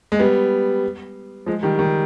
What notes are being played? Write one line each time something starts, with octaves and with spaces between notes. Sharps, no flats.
G#3
G3 B3
F3 G#3
D#3 G3
D#3 G3